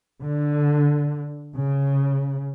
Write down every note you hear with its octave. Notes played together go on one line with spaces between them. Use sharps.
D3
C#3